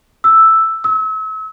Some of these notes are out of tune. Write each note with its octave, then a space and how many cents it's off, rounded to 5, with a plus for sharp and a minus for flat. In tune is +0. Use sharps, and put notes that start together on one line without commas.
E6 +0
E6 -35